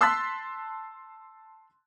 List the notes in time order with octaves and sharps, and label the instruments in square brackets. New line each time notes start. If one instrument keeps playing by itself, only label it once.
[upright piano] A5 C6 E6 F#6 A6 B6